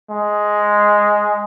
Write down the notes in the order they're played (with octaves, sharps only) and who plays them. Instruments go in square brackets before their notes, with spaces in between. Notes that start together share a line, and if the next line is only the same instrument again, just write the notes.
[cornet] G#3